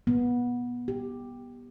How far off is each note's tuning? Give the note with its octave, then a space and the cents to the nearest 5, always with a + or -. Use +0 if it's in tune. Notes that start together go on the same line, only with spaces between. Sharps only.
B3 -20
G4 +5